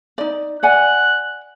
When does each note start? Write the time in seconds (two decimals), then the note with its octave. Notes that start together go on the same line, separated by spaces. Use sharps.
0.18 D#4 D5
0.63 D5 F#5 G#5 F#6